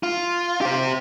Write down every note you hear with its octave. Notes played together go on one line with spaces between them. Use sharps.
F4
G4 C5